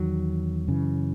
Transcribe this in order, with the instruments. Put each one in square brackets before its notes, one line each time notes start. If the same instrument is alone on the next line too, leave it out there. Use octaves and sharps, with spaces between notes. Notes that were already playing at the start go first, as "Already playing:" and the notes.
Already playing: [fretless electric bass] E2 D#3 F#3
F#2 C#3 E3